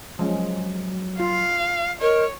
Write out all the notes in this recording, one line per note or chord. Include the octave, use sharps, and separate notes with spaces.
F3 F#3 G#3 C#4
F4 F5
A#4 C#5 D#5